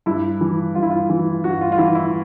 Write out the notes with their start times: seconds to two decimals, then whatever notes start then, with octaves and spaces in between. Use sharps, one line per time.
0.06 G2 E4
0.41 E3
0.75 G2 F4
0.83 E4
0.90 F4
1.09 E3
1.44 G2 F#4
1.61 F4
1.72 F4
1.78 E3 E4
1.95 E4